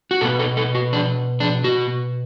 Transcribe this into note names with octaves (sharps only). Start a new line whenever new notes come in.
F#4
B2 B3 A4
A4
A4
F#4
D4
D4
F#4